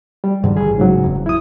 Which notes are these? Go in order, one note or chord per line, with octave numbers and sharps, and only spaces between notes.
G3
G#2 D3 D#3
A1 G#4
G#2 C#3 F#3
E1 E2
E4 D#6